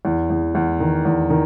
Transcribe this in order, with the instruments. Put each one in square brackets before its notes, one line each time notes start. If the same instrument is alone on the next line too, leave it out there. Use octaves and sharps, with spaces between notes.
[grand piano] E2
E2
E2
D#3
E2
D#3